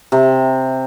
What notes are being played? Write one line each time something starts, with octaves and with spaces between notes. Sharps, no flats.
C3